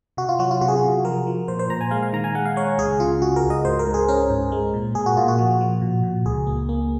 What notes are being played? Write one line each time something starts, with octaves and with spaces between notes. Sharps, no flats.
C3 F#4
F4
F#3 F#4
F4
C3 F#4
G#4
F#4
C3
F3 A#4
F3
A#2 C5
C5
A#2 A#5
G#5
G#3 F5
F5
D#3 A#5
G#5
G#3 F#5
F5
G#3 C#5
C#2 G#4
C#3 F4
C#2 F#4
A#4
C#2
D#5
G#2 C5
A#4
G#2
G#4
C#4 A#4
G#2
G#3
A#2
A#2 G#4
F#4
A#2 F4
F#4
F3
F3
A#2
A#2
C#2 G#4
A#3
A#3